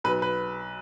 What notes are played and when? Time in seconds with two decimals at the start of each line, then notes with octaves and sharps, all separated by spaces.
0.04 B1 B4
0.22 B4